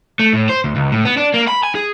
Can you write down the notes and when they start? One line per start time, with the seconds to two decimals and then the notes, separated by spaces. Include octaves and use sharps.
0.19 A3
0.33 A2
0.49 C5
0.64 D2
0.76 C#2
0.92 A2
1.05 B3
1.17 D4
1.34 A#3
1.48 B5
1.63 G#5
1.75 G#4